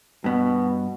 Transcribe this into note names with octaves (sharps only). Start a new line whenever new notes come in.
G2 B2 B3